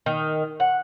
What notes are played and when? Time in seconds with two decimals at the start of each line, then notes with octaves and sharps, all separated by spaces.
0.06 D#3
0.60 F#5